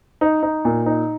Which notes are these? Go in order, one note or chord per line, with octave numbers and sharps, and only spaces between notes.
D#4
D#4
A#2
D#4